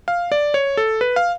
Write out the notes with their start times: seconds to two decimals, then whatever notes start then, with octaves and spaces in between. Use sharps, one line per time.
0.08 F5
0.32 D5
0.54 C#5
0.77 A4
1.01 B4
1.16 F5